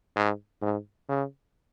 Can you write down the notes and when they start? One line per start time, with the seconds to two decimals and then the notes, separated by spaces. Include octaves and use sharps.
0.16 G#2
0.62 G#2
1.09 C#3